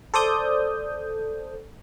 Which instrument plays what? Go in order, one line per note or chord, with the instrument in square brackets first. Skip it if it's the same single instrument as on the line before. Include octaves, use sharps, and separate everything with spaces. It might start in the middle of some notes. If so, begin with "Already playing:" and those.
[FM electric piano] A4 C5 D5 D#6 G6